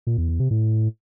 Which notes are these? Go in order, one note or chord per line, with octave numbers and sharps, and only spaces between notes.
A#2
E2
E2
C3
A2